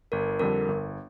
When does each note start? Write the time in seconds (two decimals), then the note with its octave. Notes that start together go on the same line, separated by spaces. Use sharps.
0.12 G1 A#4
0.39 F2 D3 G3 A#4
0.68 G1